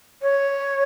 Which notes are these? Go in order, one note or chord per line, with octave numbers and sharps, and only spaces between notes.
C#5